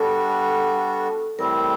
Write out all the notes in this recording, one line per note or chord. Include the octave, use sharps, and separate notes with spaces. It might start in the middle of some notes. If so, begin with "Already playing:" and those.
Already playing: G3 B3 D4 F#4 A4
A2 E3 G3 C4 A#4